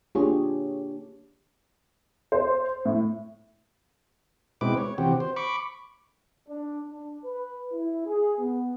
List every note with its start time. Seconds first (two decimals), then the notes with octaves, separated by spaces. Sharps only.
0.15 A#3 D4 F4 G4 G#4 C#5
2.32 C5
2.85 A2
4.61 B2 G#3 C4 E4 B4 D6
4.77 C#5
4.98 C3 E3 C4 F#4 G4
5.20 C5
5.36 B5 C#6 D6
6.47 D4
6.84 D4
7.24 B4
7.72 E4
8.05 G#4
8.38 B3